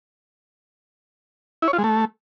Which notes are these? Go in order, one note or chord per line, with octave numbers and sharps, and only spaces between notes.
E4
C#5
F4
G#3
A3